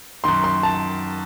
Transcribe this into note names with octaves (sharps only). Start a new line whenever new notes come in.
F#2 D#3 C6
C6
A5